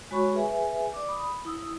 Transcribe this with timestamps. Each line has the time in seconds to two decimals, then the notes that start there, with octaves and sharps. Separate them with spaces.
0.11 G#3 F#4 C#5 B5 C#6
0.33 G#4 B4 E5 G#5
0.93 D5 D6
1.08 B5 D#6
1.45 E4 D#6 E6